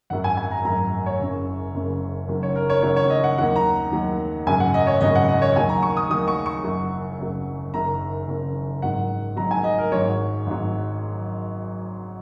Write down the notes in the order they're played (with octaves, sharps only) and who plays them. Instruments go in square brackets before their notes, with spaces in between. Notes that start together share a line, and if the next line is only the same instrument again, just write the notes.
[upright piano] G#1 F#2 F#3 F#5
G#5
G#5
A#5
G#1 F#2 F#3 A#5
C#5
F#1 F#2 C#3
F#1 F#2 C#3
F#1 F#2 D#3 F#3
C#5
A#4
C#5
F#1 F#2 D#3 F#3 C#5
C#5
D#5
F#5
D#2 D#3 F#3 F#5
A#5
D#2 D#3 F#3
G#1 F#2 C#3 F#3 G#5
F#5
D#5
C#5
G#1 F#2 C#3 F#3 D#5
F#5
D#5
C#5
D#2 D#3 F#3 G#5
A#5
C#6
D#6
D#2 D#3 F#3 D#6
C#6
C#6
F#1 F#2 F#3
F#1 F#2 F#3
F#1 F#2 D#3 A#5
F#1 F#2 D#3
G#1 G#2 D#3 F#3 F#5
G#1 G#2 D#3 F#3 A#5
G#5
D#5
A#4
G#1 G#2 F#3 C#5
G#1 G#2 F#3